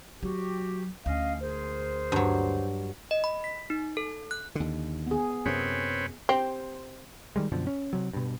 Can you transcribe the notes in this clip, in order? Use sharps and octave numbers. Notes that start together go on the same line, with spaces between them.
F#3 F#4 G4
D2 C#4 D#5 F5
G#4 A#4 C5
G2 F#3
D#5
B5
B6
D#4
A4
F#6
D#2 D3
B3 G#4
F#2 C3 C4 B4 C#5
C4 G4 C5
D#3 G3 G#3
F#2 B2 D3 F3
C#4
C3 F#3
G2 B2